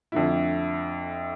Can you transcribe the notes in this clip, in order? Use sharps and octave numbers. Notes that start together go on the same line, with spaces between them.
F2 D3 A3 E4